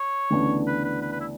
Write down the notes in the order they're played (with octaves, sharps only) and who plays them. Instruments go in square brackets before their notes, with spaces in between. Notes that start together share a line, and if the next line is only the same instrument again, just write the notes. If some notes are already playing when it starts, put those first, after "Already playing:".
Already playing: [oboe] C#5
[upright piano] D2 C#3 E3 B3 D4
[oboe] B4
B4
B4
B4
E4